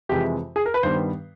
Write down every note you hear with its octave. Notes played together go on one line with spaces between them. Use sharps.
F2 C3 E3 G#3 G4
G#4
A#4
B4
G2 D#3 G3 B3 C5